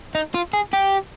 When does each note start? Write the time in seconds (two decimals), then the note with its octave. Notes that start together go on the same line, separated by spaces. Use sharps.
0.15 D#4
0.34 F4
0.53 G#4
0.73 G4